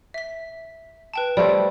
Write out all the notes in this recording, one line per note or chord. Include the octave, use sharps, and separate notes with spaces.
E5 B6
B4 G5 A5
G3 A3 C4 C#5 D5 G5